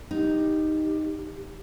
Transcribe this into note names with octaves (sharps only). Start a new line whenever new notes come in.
D#4 G4